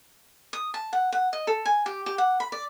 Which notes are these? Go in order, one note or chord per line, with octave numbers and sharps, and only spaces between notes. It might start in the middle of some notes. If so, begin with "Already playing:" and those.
D#6
A5
F#5
F#5
D#5
A4
G#5
G4
G4
F#5
B5
D5